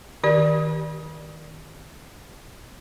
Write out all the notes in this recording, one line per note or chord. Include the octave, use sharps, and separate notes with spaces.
D#3 G4 D5